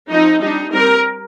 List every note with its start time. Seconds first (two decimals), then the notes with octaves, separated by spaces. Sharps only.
0.11 F3 C4 D#4
0.42 G3 D4 D#4
0.74 G3 C4 A#4